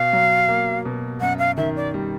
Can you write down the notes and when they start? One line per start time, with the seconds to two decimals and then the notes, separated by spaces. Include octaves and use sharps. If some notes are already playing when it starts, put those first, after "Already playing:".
Already playing: B2 F5
0.13 F#3
0.49 A#3
0.85 B2
1.21 F#2 F#5
1.39 F5
1.57 D#3 E5
1.76 D5
1.94 G3